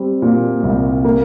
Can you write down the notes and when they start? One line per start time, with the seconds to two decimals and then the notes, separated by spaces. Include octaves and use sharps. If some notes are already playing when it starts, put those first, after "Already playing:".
Already playing: G3 C4
0.22 A#2
0.63 C2
1.04 A#3